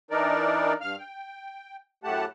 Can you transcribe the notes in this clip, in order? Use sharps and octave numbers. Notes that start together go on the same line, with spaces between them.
E3 D4 D#4 A#4 D5
G2 F5 F6
G5
F#2 A2 A3 G4 F#5 A5